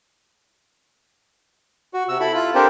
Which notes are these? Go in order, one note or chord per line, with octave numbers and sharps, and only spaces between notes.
F#4
C3 F#4 E6
E4 A4 B5
F4
C4 D4 G4 A4 A#4 C5